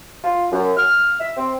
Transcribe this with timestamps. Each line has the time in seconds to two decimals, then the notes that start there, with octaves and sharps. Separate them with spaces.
0.24 F4
0.52 F#2
0.78 F6
1.20 E5
1.37 C4